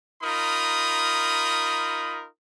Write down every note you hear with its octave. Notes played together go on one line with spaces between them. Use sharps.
D#4 F4 A#4 B5 D#6